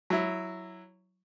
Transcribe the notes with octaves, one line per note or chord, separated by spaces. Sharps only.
F#3 E4